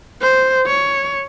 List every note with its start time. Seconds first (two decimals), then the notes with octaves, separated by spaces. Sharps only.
0.22 C5
0.66 C#5